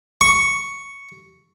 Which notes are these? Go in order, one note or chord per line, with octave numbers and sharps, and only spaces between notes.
C#6